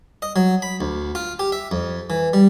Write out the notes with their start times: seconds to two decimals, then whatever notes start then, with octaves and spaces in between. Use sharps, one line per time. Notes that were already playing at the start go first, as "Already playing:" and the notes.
0.22 D#5
0.36 F#3
0.62 B5
0.81 D2
1.15 F4
1.39 G4
1.52 E5
1.71 F2
2.10 E3
2.33 G3